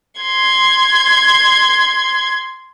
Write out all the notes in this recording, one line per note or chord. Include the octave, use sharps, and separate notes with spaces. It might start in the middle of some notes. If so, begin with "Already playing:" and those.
C6 G#6